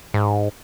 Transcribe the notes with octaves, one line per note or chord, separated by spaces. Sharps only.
G#2